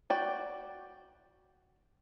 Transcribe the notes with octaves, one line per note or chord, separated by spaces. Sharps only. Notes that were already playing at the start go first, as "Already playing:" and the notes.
F#4 D5 G5